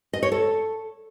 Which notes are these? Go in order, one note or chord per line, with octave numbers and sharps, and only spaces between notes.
D#5
C#5
A4